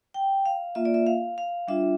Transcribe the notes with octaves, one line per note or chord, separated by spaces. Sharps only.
G5
F5
A#3 F4 E5
D5
E5
F5
F5
G3 D4 F4 E5